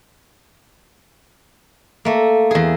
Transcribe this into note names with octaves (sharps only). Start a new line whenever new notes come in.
A3 A#3
E2 G#4